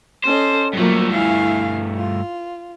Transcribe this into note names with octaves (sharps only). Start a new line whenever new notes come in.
C#4 A4 C5 D#5
G2 F3 F#3 A3 A#3
E4 F5 G#5
F4